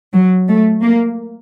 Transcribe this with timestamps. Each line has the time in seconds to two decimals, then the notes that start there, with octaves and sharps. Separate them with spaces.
0.13 F#3
0.49 A3
0.82 A#3